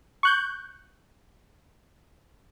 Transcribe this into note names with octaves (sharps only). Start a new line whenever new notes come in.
C#6 F#6 G6